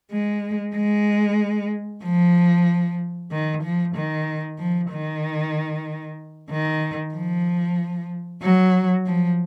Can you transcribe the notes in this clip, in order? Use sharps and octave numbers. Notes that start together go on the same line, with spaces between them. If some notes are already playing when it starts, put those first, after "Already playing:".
G#3
G#3
F3
D#3
F3
D#3
F3
D#3
D#3
F3
F#3
F3